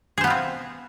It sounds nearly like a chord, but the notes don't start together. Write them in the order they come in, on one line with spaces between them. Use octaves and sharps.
G#4 C5 B3 F4 C4